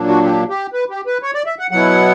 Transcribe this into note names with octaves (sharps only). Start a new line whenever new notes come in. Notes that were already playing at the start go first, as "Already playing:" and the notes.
Already playing: A#2 F#3 A#3 D4
F#4
G4
G4
B4
G4
B4
C#5
D5
E5
F#5
B2 F#3 B3 E4 F#5